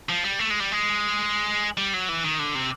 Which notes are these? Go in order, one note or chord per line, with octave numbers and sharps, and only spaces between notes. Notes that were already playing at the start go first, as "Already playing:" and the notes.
F3
G3
A3
G#3
G3
G#3
G3
F#3
E3
D#3
D3
C3